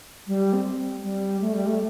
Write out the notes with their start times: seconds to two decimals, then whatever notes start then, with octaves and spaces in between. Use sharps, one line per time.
0.27 G3
0.53 C4
1.03 G3
1.41 A3
1.54 G3
1.66 A3